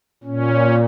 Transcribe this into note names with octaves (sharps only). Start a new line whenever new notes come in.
A#2 C#4